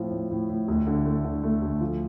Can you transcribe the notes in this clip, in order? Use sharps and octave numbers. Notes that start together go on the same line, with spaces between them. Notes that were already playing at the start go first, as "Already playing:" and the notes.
Already playing: A2 F3 C4
A2
A2
A2
D2
D3
A3
D3
A3
D2
F3